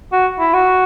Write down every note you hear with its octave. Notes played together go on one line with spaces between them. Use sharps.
F#4
E4
F#4